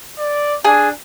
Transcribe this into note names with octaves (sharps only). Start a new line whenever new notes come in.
D5
D4 G#4 G#5